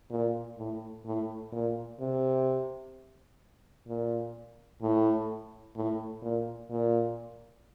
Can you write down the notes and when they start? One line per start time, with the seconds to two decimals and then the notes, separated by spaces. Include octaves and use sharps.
0.10 A#2
0.57 A2
1.05 A2
1.52 A#2
2.00 C3
3.87 A#2
4.82 A2
5.76 A2
6.22 A#2
6.70 A#2